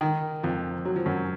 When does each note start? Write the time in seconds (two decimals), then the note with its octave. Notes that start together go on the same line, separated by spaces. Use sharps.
0.01 D#3
0.43 F2 F3
0.85 F#3
0.96 F3
1.06 F#2 F#3